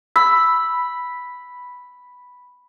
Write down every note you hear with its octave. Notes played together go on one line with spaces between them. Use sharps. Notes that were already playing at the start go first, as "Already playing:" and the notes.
B5 E6